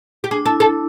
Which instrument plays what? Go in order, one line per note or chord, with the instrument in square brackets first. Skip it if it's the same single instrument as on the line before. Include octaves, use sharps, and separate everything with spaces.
[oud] G4
[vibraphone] D4 [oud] G#4
[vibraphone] E4 [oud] A4
[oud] A4